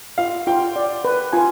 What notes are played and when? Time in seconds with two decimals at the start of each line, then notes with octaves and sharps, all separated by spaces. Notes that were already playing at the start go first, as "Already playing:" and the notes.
0.18 F4 F5
0.47 F4 G5
0.76 D5
1.05 B4
1.33 F4 G#5